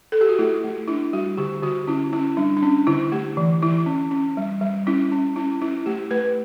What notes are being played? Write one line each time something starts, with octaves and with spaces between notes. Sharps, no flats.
A4
G4
F#4
A3 E4
A3
D4 E4
G3 F#4
D3 G4
D3 F#4
C#4 E4
C#4 E4
G3 D4
D4
C#4
D3 E4
A3 G4
E3
E3 E4
C#4
C#4
G3
G3
C#4 E4
C#4
C#4 E4
C#4 E4
A3 G4
A3 B4